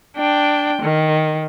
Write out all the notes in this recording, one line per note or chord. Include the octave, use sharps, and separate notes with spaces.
D4 G5
D#3